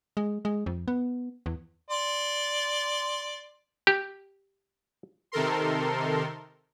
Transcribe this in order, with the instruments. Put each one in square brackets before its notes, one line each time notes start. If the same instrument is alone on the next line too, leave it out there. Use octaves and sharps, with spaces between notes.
[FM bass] G#3
G#3
F2
B3
E2
[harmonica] D5 C6
[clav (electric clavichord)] G4
[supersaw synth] C3 D#3 A4 A#4 C6